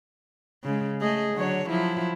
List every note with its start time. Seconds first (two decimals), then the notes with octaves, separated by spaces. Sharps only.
0.64 C#3 G#3
1.01 A3 G#4 D#5
1.34 D3 F#3 C#5
1.68 F3 F#3 E4